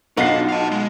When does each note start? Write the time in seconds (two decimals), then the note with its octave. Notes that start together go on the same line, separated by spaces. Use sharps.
0.17 B1 D4 D#4 F4 F#5 C7
0.49 F5 A5
0.71 G#3